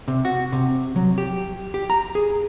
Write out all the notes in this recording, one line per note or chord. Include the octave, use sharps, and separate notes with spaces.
C3
F#4
C3
F#3
G4
G4
A#5
G#4